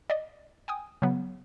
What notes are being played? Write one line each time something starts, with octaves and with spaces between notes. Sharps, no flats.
D5 D#5
G5 G#5 D#6
C#3 F#3 B3